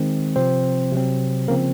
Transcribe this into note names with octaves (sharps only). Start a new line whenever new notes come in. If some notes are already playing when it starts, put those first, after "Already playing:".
Already playing: D#3 G#3 C4
C3 F3 C4 C5
C3 F#3 C4
C#3 F3 A#3 C4 A#4